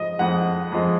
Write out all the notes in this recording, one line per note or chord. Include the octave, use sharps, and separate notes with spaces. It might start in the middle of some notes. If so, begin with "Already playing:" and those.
Already playing: F2 F3 G#3 D#5
F2 F3 G#3 F#5
F2 F3 G#3